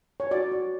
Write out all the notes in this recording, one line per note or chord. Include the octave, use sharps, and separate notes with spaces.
C#5
F#4 D5
F#4